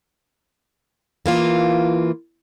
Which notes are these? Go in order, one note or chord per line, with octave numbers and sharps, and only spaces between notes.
E3 A#3 F4